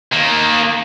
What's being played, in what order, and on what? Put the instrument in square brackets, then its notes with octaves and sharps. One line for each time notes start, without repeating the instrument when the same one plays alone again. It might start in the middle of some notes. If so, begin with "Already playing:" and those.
[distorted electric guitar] D#3 A#3